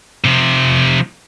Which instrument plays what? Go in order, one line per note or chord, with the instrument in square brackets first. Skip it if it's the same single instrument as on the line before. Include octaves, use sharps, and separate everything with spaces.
[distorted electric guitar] C3 F3